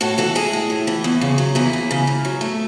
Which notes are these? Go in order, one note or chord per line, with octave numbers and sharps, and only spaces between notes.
A2 F#4 A4
E3 F#4 A4
G#3 E4 G#4
A2
A2
E3
E2
C#3
F#3
E2 E4 G#4
E2
C#3
G#2
F#3
A3